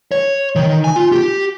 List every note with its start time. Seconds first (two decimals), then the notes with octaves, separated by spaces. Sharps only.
0.11 C#5
0.56 D#3
0.84 G#5
0.96 F4
1.12 G4